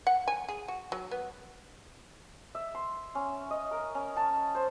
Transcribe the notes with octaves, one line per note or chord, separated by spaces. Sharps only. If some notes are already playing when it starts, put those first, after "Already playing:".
F#5
G#5
G#4
F#4
F#3
B3
E5
C6
C#4
D#5
A#4
C#4
A5
C5